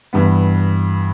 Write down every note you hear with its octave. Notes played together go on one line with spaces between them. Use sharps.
G2 E3 B3